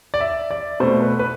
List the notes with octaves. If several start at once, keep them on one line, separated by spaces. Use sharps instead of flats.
D5
E5
D5
B2 A3 C5
B4
B4